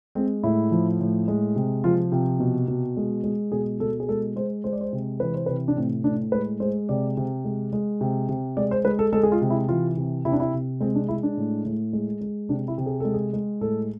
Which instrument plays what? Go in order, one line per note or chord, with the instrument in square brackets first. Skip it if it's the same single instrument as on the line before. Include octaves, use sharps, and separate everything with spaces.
[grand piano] G#3 C4
A2 E4
F3
A2
G#3
C3
F3 F4
C3 F4
B2
B2
G#3
G#3
B2 G#4
B2 A4
G#4
G#3 A4
G#3 C5
G#3 C5
D5
C5
C3
E3 B4
C5
C3 B4
D4
A2 C4
A2 D4
G#3 B4
G#3 C5
C3 D5
C3
G#3
G#3
C3
C3
G#3 D5
C5
G#3 B4
A4
G#3 A4
G#4
F4
C3
E4
E3 F4
C3
C3 E4
D4
E4
C3
G#3 C4
D4
G#3 E4
D4
A2
A2
G#3
G#3
C3 D4
E4
C3
G#4
G#3 A4
G#4
G#3
A2 A4